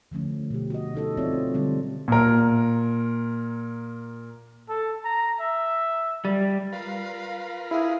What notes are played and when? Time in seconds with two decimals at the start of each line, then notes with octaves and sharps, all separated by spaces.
0.12 D3 F3 A3 C#4
0.50 B2 G4
0.70 F#4 D#5
0.94 C#4 D#4 A4 D#5
1.17 F3 C4 F4 C#5 D5 E5
1.53 D3 G3 G#3 C4 F4
2.08 A#2 A#4
4.69 A4
5.05 A#5
5.40 E5
6.25 G3
6.72 F4 A#4 B4 F5
7.71 E4 G#4 F5